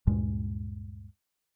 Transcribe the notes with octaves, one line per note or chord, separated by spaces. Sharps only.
D2 G2 A#2 G#3